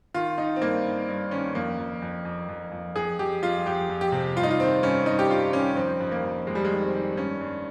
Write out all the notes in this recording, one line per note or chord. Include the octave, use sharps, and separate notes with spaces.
D#3 F4
D#3 D#4
C4
G2 A#3
G2
G2
D#3 C#4
F2 A#3
F2
F2
F2
F2
F2
F2 G#4
F2 G4
F2 F4
F2 G4
F2
G4
C3
G2 F4
D#4
F4
D#3 C4
G2 C#4
G2 D#4
G4
G2 F4
D#3 C#4
F2 C4
F2
A#3
F2
F2 G#3
G3
G#3
D#3
C4
D#3
G2 C#4
G2